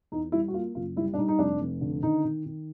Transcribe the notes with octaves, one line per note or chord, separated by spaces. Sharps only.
E2 D#4
G3 E4
F#4
A#3 F4
F#1 F4
G3 E4
D4
G3 D#4
D#4
F1 D4
F1
D3
D#3 D#4
D#3
D#3